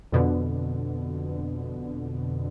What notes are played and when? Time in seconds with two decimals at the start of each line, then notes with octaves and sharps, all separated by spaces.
0.12 F2 B2 D3